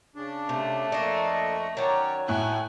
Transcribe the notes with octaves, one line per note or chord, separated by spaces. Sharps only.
C#3 D4
C3 A3
F2 A#3 D4 D#5 C#6
D#3 F#3 C#4 C#5 D5
A2 A3 E4 G#5 F#6